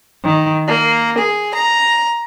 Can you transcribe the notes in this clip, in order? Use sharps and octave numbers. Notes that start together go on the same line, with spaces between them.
D#3
A#3
G#4
A#5